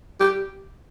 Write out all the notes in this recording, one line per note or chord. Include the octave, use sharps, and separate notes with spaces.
G4